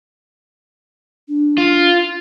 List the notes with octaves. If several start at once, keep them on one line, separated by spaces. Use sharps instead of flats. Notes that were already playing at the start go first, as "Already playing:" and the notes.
D4
F4